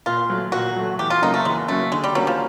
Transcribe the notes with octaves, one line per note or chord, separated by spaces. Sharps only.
A#2 F4
F#3 A3
A#2 F#4
F#3 A3
E2 G4
F4
C#3 F#3 A#3 D#4
A3
E2 G#3
C#3 F#3 A3 A#3
D3 G#3
G3
F#3 G3 A#3 C#4
F3